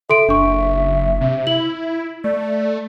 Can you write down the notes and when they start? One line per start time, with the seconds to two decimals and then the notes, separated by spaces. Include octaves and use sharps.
0.10 A4 E5 C6 D7
0.29 F#1 D4 C#6
1.21 C3
1.47 E4 F#7
2.24 A3 D5